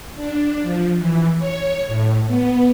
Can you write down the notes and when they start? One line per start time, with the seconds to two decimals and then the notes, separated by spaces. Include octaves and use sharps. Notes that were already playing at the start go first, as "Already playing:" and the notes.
0.16 D4
0.62 F3
0.98 E3
1.39 C#5
1.87 A2
2.27 B3